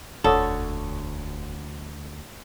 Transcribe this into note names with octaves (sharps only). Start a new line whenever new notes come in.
E1 D2 D3 A4 C#5 D#6